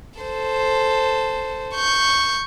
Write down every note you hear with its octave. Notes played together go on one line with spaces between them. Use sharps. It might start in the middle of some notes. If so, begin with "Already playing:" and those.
A4 C5
C#6 G6